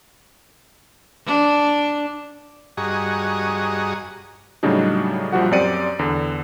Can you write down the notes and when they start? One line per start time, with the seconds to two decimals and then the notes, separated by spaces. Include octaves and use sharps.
1.26 D4
2.77 G2 F#4 G#4 D#5 A#5 C#6
4.63 A2 C#3 F#3 G3 D4 D#4
5.33 A#1 F3 G3 F#4 F#5
5.51 F#2 C4 G4 D5 C#7 D#7
5.99 E2 D3